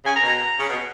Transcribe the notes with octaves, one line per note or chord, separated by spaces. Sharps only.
C#3 G#5
A#5
B2
A#5
A#5
C#3
B2